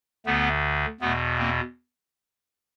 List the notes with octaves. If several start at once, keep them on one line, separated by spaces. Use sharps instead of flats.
D2 D3 A3 B3
E2 B2 A3 B3
A#3 C4